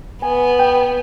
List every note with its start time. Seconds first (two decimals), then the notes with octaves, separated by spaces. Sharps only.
0.22 B3 G#5
0.59 G5